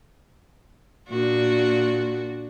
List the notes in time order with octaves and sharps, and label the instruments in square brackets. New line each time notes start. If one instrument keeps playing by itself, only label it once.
[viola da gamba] A#2 D4 F#4